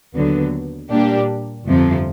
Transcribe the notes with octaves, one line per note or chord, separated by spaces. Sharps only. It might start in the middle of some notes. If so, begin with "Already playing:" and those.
D#2 D3 F#3 B3
A#2 G3 A#3 D4 G4
G1 F2 C3 F3